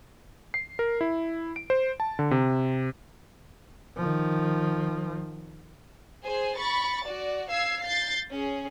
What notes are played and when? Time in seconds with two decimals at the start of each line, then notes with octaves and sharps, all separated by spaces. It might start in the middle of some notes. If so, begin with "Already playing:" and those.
0.54 C7
0.79 A#4
1.01 E4
1.56 D7
1.70 C5
2.00 A5
2.19 D3
2.31 C3
3.97 D#3 F3
6.24 G#4 C5 G#5
6.57 B5 C#6 A6
7.07 F#4 D5
7.50 F5 E6 G#6 C7
7.82 G6 A6 C7
8.31 C#4 G#4